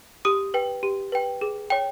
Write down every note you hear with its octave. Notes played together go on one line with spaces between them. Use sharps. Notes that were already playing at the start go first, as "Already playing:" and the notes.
G4 D#6
B4 G5
G4
B4 G5
G#4
C#5 G5